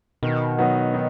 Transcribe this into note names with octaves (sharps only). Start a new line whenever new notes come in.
B2 D#3
F#3 B3 D#4
D#3